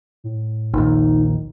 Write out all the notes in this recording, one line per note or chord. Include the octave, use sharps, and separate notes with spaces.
A2
A#1 D#2 D#4